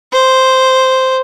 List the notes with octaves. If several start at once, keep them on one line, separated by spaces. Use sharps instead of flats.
C5